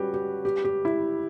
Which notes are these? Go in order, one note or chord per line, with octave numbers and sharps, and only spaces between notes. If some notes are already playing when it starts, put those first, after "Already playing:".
Already playing: G3 C#4 F#4 G4 B4
G4
G4
G4
E4